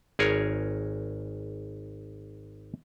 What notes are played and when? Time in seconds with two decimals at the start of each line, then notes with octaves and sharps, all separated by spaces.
0.19 G#1 G#4 A#4 C#5